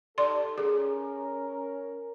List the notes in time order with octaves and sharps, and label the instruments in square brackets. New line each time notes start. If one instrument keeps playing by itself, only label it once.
[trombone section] D#4 G4 A4 [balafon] D5 C6
[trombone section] C#4 A#4 [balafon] G#4